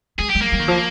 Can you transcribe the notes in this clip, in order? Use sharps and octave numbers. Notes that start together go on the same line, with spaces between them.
G#3 G#4
G#3 G4
A#3
G3
D#3
F3